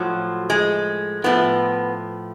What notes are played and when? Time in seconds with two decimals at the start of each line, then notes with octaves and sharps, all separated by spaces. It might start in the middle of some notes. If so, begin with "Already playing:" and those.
Already playing: A2 F3 F#3
0.50 G#3
1.24 A2 F3 B3